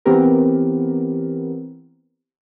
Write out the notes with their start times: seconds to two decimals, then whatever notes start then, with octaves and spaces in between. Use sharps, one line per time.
0.05 E3 B3 C4 G4 A#4